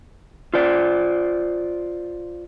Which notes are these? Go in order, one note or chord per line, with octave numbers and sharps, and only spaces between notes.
F4 C5 D5